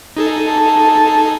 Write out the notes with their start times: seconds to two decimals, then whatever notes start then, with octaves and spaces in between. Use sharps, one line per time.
0.17 D#4 G#4 A4
0.49 A5